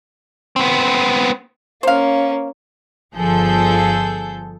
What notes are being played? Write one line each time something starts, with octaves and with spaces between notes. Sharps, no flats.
B3 C4
A#3 C#4 C5 F5
G1 F3 G#4 A4 G6